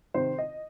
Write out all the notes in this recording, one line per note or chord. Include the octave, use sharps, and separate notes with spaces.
C3 D#3 C5
D#5